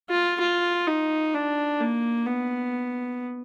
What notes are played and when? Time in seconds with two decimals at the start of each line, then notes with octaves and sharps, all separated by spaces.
0.09 F4
0.41 F4
0.87 D#4
1.34 D4
1.80 A#3
2.26 B3